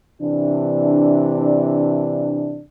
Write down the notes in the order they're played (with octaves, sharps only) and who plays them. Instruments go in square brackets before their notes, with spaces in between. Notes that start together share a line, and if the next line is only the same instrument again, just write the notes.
[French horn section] C3 E3 D4